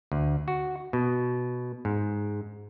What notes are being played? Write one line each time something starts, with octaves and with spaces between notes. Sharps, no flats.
D2
F#4
B2
G#2